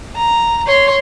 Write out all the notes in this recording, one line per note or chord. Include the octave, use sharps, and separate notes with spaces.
A#5
C#5 C6